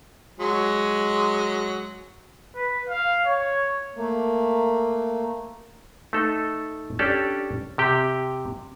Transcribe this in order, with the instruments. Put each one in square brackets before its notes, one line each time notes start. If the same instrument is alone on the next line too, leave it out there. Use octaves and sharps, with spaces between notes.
[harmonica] F#3 G#3
[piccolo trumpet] B4
F5
C#5
[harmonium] A3 A#3
[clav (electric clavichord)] A3 D#4 A4
C#4 D4 G4 A4 D5
C3 G4 G5